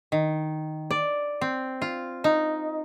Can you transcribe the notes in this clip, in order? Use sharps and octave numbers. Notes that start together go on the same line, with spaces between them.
D#3
D5
C4
F4
D#4